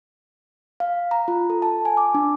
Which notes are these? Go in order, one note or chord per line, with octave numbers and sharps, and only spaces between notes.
F5
A#5
F4
A4
A5
G#5
D6
D4